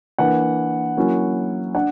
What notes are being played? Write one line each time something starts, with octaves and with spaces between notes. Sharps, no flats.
E3 A#3 D4 F#5
F#3 A#3 C#4 E4
D4 F#5